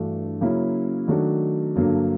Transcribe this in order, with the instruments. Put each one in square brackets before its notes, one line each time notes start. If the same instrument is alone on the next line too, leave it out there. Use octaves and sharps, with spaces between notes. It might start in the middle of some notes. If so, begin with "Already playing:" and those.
Already playing: [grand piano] G2 E3 A3 D4 F#4
C#3 F#3 A#3 C#4 E4
D#3 F#3 A3 D4 F#4
G2 D3 F#3 A#3